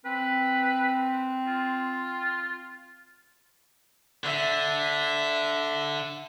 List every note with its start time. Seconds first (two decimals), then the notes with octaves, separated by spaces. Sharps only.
0.05 C4 B4
1.47 F4
4.24 D3 E5